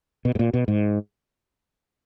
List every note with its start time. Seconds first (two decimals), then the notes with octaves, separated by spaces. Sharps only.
0.25 B2
0.35 G#2
0.39 A#2
0.54 B2
0.68 G#2